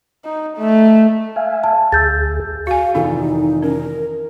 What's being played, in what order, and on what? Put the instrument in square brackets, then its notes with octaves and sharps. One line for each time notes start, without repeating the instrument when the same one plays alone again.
[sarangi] D#4
A3
[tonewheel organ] E5 F5 G#5
[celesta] A5
[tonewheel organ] D2 G#4 [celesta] E6 G6 A6
[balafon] F#4 G#5 [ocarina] F5
[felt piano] F1 D#3 E3 [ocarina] D#4 [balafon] F4 A4
[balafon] C#4 [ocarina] A#4